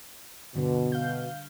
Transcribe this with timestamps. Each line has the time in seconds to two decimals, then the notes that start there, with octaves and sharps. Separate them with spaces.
0.55 G2 B2 D3
0.92 F5 G6